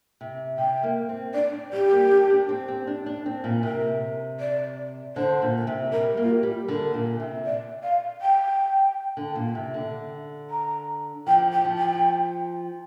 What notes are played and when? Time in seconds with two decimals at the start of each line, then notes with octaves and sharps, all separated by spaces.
0.21 C3
0.58 C3 G5
0.83 A#3
1.09 C4
1.34 D4 D5
1.53 C4
1.73 G3 G4
1.91 A#3
2.11 D4
2.30 D4
2.49 C4
2.68 C4
2.87 D4
3.06 D4
3.26 C4
3.44 A#2
3.63 C3 A#4
4.40 D5
5.16 D3 C5
5.42 A#2
5.67 C3
5.92 G3 A#4
6.17 A#3
6.23 F4
6.31 G4
6.43 G3
6.68 D3 A#4
6.94 A#2
7.20 C3
7.45 D5
7.83 F5
8.22 G5
9.17 D3
9.35 A#2
9.55 C3
9.74 D3
10.50 A#5
11.27 F3 G5
11.52 G5
11.65 F3
11.78 G5